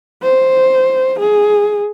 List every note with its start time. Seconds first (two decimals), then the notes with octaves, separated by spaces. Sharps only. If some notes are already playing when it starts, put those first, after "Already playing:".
0.22 C5
1.19 G#4